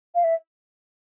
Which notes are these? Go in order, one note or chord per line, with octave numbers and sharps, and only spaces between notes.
F5
E5